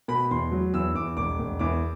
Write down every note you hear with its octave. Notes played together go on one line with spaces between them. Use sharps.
B2 B5
E2 C6
F#3
E2 E6
E2 D6
E1 D6
E1
E2 D6